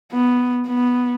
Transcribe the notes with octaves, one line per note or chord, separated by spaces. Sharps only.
B3
B3